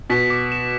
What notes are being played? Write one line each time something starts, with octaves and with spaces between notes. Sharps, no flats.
B2 B6
D6
E7